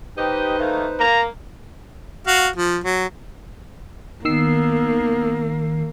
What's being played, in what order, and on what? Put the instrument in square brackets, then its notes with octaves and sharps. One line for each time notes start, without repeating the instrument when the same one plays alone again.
[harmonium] D#4 B4 C5 [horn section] G4 D#5
[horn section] D#3 A3 A#3
[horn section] A#3 [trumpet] A#5
[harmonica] F#4 F5
F3
F#3
[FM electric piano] D#3 E6 C7 [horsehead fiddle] A#3 [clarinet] B3